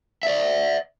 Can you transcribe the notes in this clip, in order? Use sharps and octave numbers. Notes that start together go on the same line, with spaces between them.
D5 E5